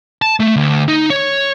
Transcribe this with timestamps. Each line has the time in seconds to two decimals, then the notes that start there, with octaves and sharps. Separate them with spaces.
0.22 A5
0.40 A3
0.57 D2
0.88 D#4
1.10 C#5